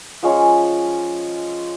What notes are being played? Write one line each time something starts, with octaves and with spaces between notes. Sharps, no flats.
F3 G#3 C#4